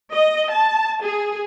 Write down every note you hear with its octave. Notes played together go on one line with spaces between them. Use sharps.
D#5
A5
G#4